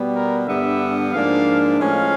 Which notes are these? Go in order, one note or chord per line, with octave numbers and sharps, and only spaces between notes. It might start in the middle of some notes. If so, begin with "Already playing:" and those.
Already playing: B2 G3 B3
A#4
G2 D3 G3 B3 E5
G#2 F3 A#3 D4 F5
A2 F3 G#3 C#4 F5